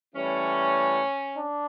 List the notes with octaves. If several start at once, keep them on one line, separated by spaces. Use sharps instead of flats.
A2 E3 G3 C#4
D4